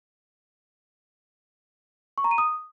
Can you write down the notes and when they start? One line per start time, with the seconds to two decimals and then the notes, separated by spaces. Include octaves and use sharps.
2.18 C#6
2.24 A#5
2.31 D#7
2.38 D#6